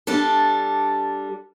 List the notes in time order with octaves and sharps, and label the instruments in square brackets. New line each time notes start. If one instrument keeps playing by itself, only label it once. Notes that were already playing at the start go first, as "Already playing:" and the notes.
[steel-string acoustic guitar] G3 D4 A4